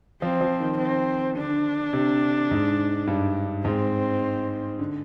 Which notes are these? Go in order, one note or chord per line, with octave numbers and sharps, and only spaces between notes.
F3 C4
F3
D#3
C4
D3 D4
C3
G#2
G2
G#2 C4
D3